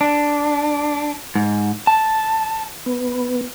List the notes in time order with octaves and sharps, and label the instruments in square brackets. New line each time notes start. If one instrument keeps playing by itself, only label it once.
[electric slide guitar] D4
G#2
A5
[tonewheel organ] B3